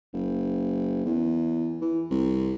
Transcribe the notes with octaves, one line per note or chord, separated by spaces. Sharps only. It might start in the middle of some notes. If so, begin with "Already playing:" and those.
F#1
E2
E3
C2